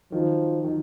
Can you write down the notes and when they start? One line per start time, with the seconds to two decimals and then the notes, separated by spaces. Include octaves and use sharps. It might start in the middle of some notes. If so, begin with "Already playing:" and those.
0.12 D#3 F3 F#3
0.64 D#3 F#3